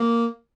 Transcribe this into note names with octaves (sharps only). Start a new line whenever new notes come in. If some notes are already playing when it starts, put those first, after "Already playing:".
Already playing: A#3